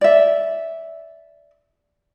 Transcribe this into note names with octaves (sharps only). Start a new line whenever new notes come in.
D5 E5